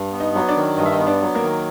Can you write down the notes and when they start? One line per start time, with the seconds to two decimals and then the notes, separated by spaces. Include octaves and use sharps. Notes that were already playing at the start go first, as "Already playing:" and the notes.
Already playing: G2
0.12 B3
0.20 D#4 D#5
0.35 F#3
0.49 D4 D5
0.56 D#3
0.78 G2 D#5
0.86 E5
0.92 D#4 D#5
0.99 B3
1.07 D4 D5
1.21 F#3
1.35 A#3 A#4
1.42 D#3